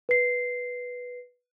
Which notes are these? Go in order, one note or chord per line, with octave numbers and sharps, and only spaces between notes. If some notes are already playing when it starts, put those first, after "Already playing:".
B4 C7